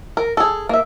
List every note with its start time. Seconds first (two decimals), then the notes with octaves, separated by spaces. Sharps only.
0.17 A#4
0.37 G#4 A4
0.69 A#3 E5